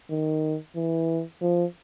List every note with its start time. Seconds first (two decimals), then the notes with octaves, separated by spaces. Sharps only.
0.10 D#3
0.76 E3
1.42 F3